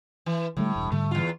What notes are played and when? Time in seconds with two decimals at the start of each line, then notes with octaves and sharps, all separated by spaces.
0.26 E3
0.57 A2 D3 G3 A3
0.76 E1 G2
0.92 G#2 D3 G3 A3
1.11 E2 F4